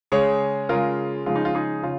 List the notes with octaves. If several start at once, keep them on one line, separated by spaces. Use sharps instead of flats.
C#3 G#3 G#4 C#5
C#3 G#3 F4 A#4
C#3 F3 G#3 F4
D#4
F4
D#4 G#4
C#3 F4